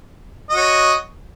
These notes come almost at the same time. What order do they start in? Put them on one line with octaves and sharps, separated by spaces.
D#5 F#4 C#5